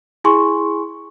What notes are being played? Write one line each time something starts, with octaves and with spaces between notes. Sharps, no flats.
E4 G#4 G#5 C6 C#6